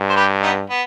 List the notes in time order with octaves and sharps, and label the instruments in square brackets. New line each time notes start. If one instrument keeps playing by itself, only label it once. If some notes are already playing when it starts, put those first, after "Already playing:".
Already playing: [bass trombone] G2
[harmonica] C5
G4 B4
B3 D#4
B3